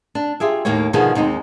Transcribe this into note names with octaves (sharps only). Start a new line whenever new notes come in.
D4
F4 G4 G#4 E5
D#2 A2 A#3 G4 C#5
B2 D3 D#3 F3 B3 G#4
D#2 G#3 C4 D#4